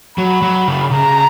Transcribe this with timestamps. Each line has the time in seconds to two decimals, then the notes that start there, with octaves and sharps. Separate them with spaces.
0.18 F#3 B5
0.42 F#3
0.68 C#3
0.91 C#3 A#5